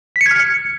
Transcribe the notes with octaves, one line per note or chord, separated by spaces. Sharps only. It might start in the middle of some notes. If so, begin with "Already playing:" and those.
B6
C#7
G#6
F6
C#7